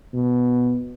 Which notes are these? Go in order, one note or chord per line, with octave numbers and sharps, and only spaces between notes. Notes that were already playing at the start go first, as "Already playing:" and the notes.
B2